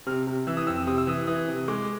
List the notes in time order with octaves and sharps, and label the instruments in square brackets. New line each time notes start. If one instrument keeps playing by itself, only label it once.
[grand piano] C3 F6
C3
E3 E6
D#6
F2 E6
C3 D#6
E6
E3 D#6
E3 D#6
C3
G#3 D6